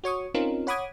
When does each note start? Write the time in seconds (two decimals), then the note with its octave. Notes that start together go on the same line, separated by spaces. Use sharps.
0.04 F#4 C#5 C#6 D#6
0.34 C4 C#4 D#4 F4 A#4
0.67 C#5 F#5 B5 D6 D#6 G#6